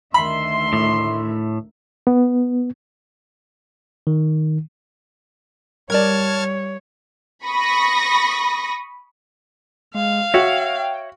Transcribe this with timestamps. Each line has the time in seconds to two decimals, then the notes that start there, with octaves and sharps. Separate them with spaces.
0.14 D2 D#3 E5 B5 C6
0.73 A2
2.07 B3
4.07 D#3
5.90 G3 A#4 C#5 D5 A5 F6 G#6
7.45 B5 C#6 D#6 A#6
9.95 G#3 F5
10.34 F#4 C#5 E5 G5